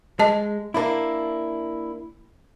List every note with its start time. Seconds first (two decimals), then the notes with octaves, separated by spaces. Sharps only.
0.19 G#3 D#5 A5
0.74 A#3 D4 E4